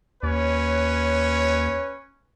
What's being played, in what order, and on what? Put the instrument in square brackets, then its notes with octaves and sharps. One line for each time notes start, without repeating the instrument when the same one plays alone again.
[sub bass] D#2 [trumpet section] C#4 B4 C#5